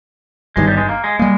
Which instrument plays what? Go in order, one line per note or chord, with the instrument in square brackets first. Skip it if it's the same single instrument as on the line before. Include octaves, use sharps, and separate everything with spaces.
[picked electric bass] G1 G2 D#3 [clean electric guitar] G#3
[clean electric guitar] G3
G#3
A#3
G#3
[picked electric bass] G3 A#3 [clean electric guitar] G#3